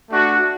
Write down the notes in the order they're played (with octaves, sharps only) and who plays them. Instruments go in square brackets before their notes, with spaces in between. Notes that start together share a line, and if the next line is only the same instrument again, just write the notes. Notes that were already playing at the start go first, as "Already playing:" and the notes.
[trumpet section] A3 D4 F#4